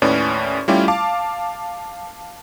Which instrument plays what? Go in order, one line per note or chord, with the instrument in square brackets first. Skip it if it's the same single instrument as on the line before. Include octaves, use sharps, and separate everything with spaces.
[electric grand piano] D#2 A2 C#4 B4 D5
G3 A3 C#4 E4 F4 G4
F5 A5 D6